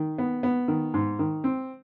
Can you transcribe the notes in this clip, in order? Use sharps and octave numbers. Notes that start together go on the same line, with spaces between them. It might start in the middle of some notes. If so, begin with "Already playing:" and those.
Already playing: D#3
B3
B3
D#3
G#2
D#3
C4